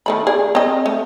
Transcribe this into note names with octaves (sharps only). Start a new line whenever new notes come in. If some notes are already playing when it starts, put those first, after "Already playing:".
D#3 A3 B5
G#4 D5
C4 D#5
A3